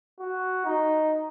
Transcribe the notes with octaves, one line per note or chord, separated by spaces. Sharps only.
F#4
D#4